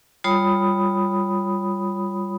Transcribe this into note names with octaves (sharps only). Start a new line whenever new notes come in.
G3 F4 C#5 B5 D#6